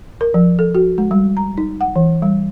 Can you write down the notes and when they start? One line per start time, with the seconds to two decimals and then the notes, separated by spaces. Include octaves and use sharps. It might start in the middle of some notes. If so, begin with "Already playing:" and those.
0.21 A#4
0.34 F3
0.59 A4
0.75 F#4
0.98 G#3
1.11 G3
1.37 A#5
1.58 D#4
1.81 F#5
1.96 E3
2.22 G3